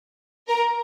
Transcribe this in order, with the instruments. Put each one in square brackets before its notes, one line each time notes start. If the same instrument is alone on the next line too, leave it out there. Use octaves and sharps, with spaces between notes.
[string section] A#4